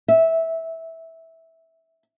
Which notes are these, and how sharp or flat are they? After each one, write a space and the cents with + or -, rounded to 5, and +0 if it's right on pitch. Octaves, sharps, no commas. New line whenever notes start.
E5 -15